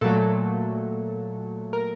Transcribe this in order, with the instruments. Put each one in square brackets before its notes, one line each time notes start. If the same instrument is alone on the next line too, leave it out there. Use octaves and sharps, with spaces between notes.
[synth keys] A#2 F#3 A3 A4
A#4